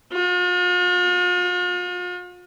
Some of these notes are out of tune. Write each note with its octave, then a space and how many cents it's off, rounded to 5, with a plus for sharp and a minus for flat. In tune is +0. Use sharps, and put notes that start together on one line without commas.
F4 +45